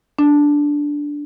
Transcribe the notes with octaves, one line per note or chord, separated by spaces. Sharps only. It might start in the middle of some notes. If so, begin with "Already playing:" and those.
D4